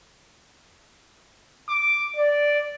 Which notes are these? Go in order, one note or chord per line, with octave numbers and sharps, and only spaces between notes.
D6
D5